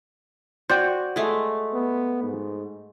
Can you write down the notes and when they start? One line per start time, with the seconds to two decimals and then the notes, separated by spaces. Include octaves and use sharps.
0.70 F#4 C5 D5 G5
1.16 G#3 A3
1.74 B3
2.23 G#2